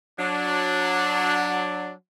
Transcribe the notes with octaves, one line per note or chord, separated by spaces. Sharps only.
F#3 D4